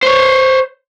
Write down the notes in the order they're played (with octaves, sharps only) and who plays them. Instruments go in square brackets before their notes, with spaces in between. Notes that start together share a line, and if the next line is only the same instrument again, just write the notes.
[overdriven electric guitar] C5 C#5